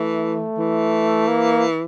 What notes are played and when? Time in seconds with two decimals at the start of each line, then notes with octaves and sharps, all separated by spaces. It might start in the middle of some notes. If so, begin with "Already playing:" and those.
Already playing: E3 A3
0.58 E3
1.28 A#3